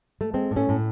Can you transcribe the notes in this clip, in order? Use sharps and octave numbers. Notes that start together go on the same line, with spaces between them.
A3
G#3 C4
A2
A3 C#4
A2